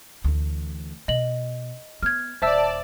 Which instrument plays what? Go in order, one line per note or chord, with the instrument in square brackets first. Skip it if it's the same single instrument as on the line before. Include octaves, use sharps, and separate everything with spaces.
[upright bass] D2 E3
[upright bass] B2 [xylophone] D#5 F#7
[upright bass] B3 [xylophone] F6 G#6
[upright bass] D#1 [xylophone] C5 E5 E6 [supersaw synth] D5 A5